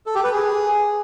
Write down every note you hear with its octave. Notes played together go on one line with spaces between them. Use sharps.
A4
G4
B4
G#4